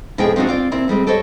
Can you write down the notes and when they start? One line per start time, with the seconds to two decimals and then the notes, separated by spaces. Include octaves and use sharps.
0.18 F2 B2 G#3 E4 G#4 G5
0.36 F3 C4 D4 D#4 F#4
0.47 C4 F4 D5
0.72 A#2 C4 E4
0.88 F2 G3 G#3 C4
1.07 G4 A4 C5 C#5 D#5